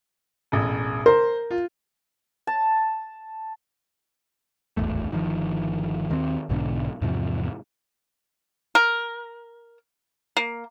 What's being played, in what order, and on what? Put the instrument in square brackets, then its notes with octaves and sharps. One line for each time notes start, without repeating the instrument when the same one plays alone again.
[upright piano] E1 A1
[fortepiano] A#4 [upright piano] C5
[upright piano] F4
[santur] A5
[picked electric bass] D1 G#1 E2 A3
G1 D#3 F3
D#2 D#3 B3 C4
B1 G#2 B2 D3
E2 G#2 C3 F3
[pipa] A#4
A#3